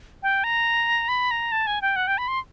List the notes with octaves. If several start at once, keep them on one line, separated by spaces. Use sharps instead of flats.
G5
A#5
B5
A#5
A5
G#5
G5
F#5
G5
B5
C6